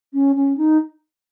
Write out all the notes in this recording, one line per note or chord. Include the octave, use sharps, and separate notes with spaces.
C#4
C#4
D#4